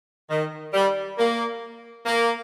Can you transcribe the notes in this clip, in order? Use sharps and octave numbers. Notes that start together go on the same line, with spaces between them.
D#3
G3
A#3
A#3